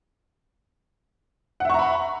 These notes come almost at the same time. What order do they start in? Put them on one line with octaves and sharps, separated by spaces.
F#5 E5 C#6 A#5 B5